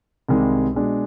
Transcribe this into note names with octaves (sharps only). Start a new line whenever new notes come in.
C2 C3 D#3 G#3
B2 G#3 D4